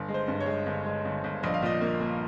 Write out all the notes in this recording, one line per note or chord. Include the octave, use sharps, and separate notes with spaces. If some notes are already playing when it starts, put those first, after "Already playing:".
Already playing: G1
G#3
C5
G2
C#5
G#3
G1
G#3
G1
G1
A#1 D#5
F5
A#2 D#5
A#3
A#3